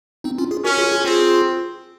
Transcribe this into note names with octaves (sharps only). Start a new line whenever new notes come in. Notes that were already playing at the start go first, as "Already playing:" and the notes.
C4 D#4
C#4 F4
F4 G#4
C#4 F#4 A#4
F4 G#4
F4 G#4
C4 F4 G#4